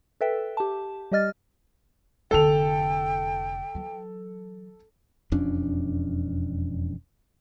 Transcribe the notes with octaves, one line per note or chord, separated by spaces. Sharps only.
A4 B4 E5 G5
G4 A5
G3 G4 D#5 F6 A6
F1 D3 A4 G5 F7
E3 F#3
E1 F2 C#4 D4